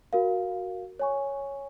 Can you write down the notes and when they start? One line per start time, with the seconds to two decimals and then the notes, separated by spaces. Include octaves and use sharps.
0.13 F#4 A#4 F5
0.99 C#5 G#5 C#6